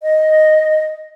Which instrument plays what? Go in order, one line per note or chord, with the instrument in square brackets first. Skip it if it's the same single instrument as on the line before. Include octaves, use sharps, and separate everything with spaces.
[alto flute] D#5